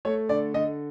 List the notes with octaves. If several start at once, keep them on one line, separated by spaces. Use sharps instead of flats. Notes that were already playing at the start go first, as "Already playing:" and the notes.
A3 C#5
D3 D5
D3 D#5